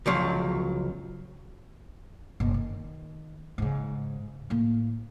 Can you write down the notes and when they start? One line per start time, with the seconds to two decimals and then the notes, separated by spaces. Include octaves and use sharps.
0.06 C#2 F3 F#3
2.40 F#1 B2
2.54 D#3
3.58 G#2 C#3
4.50 A2 A#3